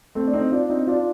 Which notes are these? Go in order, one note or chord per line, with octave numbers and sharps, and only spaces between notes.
A3 C4
D4
C4 D#4
D4 F4
C4 D#4
D4 F4